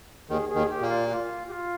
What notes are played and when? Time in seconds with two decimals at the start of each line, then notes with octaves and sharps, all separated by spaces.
0.29 D#2 D#3 G#4
0.49 G#4
0.55 D#2 D#3
0.69 G4
0.81 A#2 A#3
0.88 F4
1.08 G4
1.12 F4
1.48 G4
1.52 F4